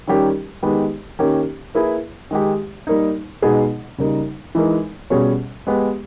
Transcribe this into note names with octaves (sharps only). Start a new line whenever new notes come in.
D#3 G3 C#4 G4 A#4
D#3 G#3 B3 G4 B4
D#3 A#3 C#4 G4
A#3 E4 G#4 B4
D#3 G#3 D#4 G4
G3 A#3 D#4
B2 G#3 B3 D#4 G#4
C#3 G3 A#3 D#4
E3 G#3 D#4 A#4
B2 G3 C#4 G#4 C#5
G#3 B3 G4